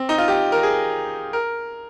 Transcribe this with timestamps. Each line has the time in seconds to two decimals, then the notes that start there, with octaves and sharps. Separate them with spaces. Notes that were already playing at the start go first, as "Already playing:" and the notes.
Already playing: C4
0.09 D#4
0.18 F4
0.28 G4
0.52 A#4
0.63 G#4
1.33 A#4